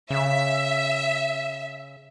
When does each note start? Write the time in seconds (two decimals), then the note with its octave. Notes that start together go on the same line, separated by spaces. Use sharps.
0.10 C#3 E5